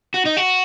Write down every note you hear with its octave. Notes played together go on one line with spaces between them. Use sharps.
F#4
D#4
F#4